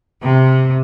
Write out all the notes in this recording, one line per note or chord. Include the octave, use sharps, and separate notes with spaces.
C3